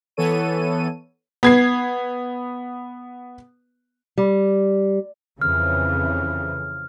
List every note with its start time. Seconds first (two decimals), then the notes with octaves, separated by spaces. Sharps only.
0.17 E3 B3 A4 C#5 D#7
1.43 B3 G#6 C7
4.18 G3
5.42 F2 C#3 E3 F6